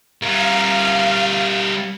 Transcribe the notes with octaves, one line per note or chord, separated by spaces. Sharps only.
G3 A#4 F5